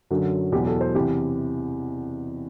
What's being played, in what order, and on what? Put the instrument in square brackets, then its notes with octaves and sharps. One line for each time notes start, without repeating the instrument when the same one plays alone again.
[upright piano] F#2 D3 F#3
E2 B2 F#3 G4
A4
C5
E2 C3 E3 G4